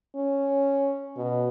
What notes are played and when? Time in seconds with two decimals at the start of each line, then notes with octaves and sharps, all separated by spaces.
0.15 C#4
1.17 B2